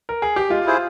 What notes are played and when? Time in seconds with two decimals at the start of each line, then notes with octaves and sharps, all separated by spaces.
0.09 A#4
0.22 G#4
0.36 G4
0.49 G#3 F4
0.66 E4 G#4 C5